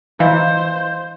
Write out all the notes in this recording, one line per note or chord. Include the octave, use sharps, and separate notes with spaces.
E3 E4 C5 D#5 F5